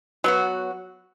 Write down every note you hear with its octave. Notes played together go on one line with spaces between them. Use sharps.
F#3 B3 F#4